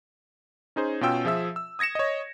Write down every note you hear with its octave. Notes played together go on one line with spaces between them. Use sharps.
C#4 D#4 G#4 C5
B2 C#4 F4 G5 E6
F3 G#4 E5 E6
E6
D#6 G#6 A#6 C#7 E7
C#5 D#5